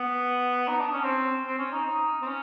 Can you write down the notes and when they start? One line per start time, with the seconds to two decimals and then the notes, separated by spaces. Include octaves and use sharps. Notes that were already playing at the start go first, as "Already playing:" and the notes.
Already playing: B3
0.68 D#4
0.80 D4
0.93 C#4
1.04 C4
1.45 C4
1.59 C#4
1.72 D#4
1.86 D#4
2.22 C4
2.27 C#4